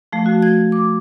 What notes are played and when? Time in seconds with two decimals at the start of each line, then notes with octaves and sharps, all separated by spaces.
0.12 F3 A3
0.26 F#4
0.42 G#6
0.72 D6